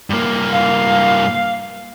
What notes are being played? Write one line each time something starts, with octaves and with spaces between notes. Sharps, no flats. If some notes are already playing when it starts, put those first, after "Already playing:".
G2 A#3
F5